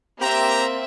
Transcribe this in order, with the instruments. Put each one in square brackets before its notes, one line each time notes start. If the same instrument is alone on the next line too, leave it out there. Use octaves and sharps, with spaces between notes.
[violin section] A#3 C4 E5 [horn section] G4 A#5